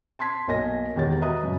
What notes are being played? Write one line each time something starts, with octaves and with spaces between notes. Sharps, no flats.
A5 C6 G#6 B6
B1 A#3 C#5 D#5 G#5 A#6
E1 E2 D#3 G4 C#5 A6
F#4 B4 D#5 E5 A#5 D#6
F#2 C#3